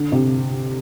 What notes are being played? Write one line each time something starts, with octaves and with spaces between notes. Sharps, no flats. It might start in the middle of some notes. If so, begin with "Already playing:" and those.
Already playing: D3
C3